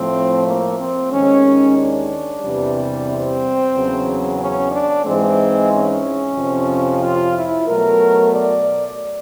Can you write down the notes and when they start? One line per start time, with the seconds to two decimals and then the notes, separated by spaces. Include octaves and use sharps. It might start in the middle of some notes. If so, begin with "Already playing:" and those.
Already playing: A2 F3 A3 C4
0.45 A#3
0.78 C4
1.11 D#2 D#3 G#3 C#4
1.76 D4
2.42 E2 C3 E3 G3
3.07 C4
3.73 E2 C#3 F#3
4.39 C#4
4.71 D4
5.04 G#2 E3 G#3 C4
5.70 C#4
6.35 F2 C3 F3
7.01 F4
7.34 E4
7.67 B2 F#3 A3 A#4
8.33 D5